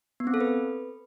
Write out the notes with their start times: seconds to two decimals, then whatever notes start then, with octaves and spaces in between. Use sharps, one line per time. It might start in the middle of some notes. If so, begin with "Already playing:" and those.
0.20 B3
0.27 C4
0.34 A4
0.41 B4